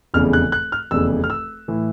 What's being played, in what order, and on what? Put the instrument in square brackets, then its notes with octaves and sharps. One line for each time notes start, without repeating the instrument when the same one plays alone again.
[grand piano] F1 E2 C#3 F6
F#6
F#6
F6
F1 E2 C#3 E6
F6
E6
A2 E3